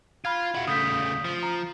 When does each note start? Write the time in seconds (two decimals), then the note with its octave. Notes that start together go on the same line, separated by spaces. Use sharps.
0.25 F4 B5 F6 G#6
0.55 E4 F#4 F5
0.67 C#3 A3 D#6 G6 B6
1.24 F3
1.43 A#5